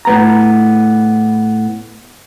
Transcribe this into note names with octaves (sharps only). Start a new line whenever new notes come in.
A2 B3 A#5